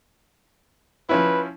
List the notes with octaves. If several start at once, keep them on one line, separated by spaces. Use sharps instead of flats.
F3 C#4 E4 B4